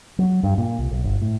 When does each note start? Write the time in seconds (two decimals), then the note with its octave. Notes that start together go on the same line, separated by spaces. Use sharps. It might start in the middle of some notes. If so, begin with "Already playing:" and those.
0.19 F#3
0.43 G2
0.58 A#2
0.79 C2
0.91 B1
1.04 G1
1.22 A2